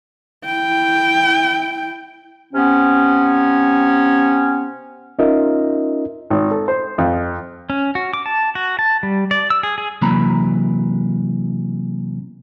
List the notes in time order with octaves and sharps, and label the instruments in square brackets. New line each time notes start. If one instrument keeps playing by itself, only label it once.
[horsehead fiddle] E4 G5
[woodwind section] C3 B3 C#4
[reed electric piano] C#4 D#4 F4 A#4 D#5 E5
[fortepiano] G#1
A4
C5
F2
[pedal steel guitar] C#4
F#4
D6
A5
F#4
A5
G3
D5
E6
G#4
G#4
[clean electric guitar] C3 E3 F#3 A#3 A#5 B5